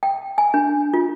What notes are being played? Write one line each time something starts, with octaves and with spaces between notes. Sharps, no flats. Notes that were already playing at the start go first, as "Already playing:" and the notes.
G5
G#5
D4
F4